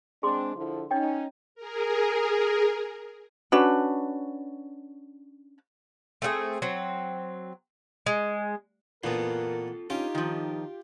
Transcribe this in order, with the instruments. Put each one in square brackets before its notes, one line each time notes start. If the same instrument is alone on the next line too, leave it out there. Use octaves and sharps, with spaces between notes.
[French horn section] G#3 C4 D4 [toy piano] G#4 C6 D6
[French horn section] D3 F3 E4
[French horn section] C#4 D#4 [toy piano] C#5 D#5 G5
[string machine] G#4 A#4
[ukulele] C#4 D4 F#4 B4
[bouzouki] A3 C4 F4 G#4
F#3 C4
G#3
[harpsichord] A#2 [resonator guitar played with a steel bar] E3 B3 [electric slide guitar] F4 A4 [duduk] A#4
[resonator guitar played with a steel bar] C#4 [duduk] D#4 [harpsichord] F4 [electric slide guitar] G4
[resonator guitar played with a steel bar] D#3 F3